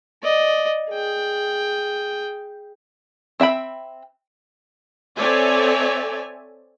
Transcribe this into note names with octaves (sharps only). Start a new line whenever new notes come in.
D5 D#5
G#4 G5
C4 E5 G5 B5
C4 A4 C#5 D5 E5 G#5